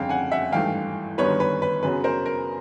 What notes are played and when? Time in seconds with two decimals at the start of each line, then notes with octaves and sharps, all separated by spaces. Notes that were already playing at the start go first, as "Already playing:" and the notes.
Already playing: G1 F2 C#3 F5 G5
0.09 F#5 G#5
0.32 E5 F#5
0.52 G#1 G2 E3 A3 F5 G5
1.18 G1 F#2 D#3 G3 B3 B4 C#5
1.40 B4 C#5
1.62 B4
1.83 F#2 C#3 F#3 B3 B4
2.04 A#4 C5
2.26 A#4